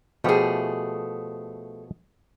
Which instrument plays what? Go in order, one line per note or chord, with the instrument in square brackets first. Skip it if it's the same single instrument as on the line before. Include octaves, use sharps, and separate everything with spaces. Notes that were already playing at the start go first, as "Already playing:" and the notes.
[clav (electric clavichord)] B2 F3 G4 [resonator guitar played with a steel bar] A3 G#4